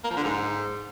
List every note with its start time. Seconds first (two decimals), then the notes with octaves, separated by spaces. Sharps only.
0.04 A#3
0.10 F3
0.17 D3
0.23 G#2